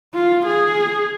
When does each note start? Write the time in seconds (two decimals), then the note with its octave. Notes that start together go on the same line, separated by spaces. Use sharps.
0.14 F4
0.46 G#4